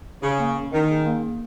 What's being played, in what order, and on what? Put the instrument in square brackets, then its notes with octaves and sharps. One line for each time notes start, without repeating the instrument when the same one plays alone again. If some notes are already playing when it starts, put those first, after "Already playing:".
[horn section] C#3 [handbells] G#4
[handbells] A#3
A#3
[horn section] D#3 [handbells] C#4
[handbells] G#4
A#3
A#3